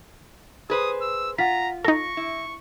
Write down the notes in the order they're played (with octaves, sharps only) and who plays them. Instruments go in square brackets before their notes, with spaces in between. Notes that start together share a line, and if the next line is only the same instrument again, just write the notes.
[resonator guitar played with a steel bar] G#4 B4 C5 [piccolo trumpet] D#6
[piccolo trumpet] E6
[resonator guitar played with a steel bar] F4 [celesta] F#5 B6 [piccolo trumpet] A#5
[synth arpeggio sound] D#4 A4 [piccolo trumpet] C#6 [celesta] A#6
[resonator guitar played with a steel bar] E4